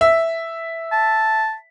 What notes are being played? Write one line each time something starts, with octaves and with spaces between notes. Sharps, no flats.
E5
A5